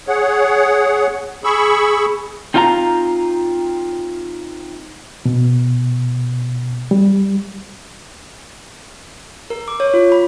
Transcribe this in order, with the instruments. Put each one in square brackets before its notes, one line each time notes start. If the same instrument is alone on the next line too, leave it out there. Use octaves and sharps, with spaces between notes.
[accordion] G#4 C#5 F#5
G#4 B5 C#6 E6
[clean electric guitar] C4 D#4 F4 F5 G5 A#5
[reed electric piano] B2
G3
[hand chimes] A#4
D6
C#5
F4
B5